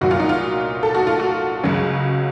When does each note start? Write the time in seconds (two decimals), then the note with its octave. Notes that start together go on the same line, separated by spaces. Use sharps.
0.01 C2 A#2 F#3 F#4
0.11 F4
0.20 D#4
0.29 F4
0.83 A4
0.95 F#4
1.07 F4
1.20 F#4
1.64 C#2 C#3 F#3